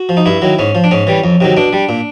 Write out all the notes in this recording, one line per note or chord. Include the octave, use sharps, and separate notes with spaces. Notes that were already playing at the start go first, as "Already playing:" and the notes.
Already playing: F#4
F3
D#4
G2 E4
D#3 F#3
G#2 C#4
F3
D4
G#2 C#4
E3 G3
F2
C3 D#3 F#3
B2 D4
G3
A#2